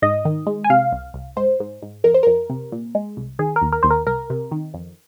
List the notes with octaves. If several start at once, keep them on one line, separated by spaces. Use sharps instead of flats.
G#2 D#5
D#3
G#3
G#5
C3 F5
C2
C2
G#2 C5
G#2
G#2
F2 A#4
C5
F2 A#4
C3
A#2
G#3
C2
D#3 G#4
A#4
D#2
A#4
D#2 C5
A#4
C2 A#4
C3
D#3
F2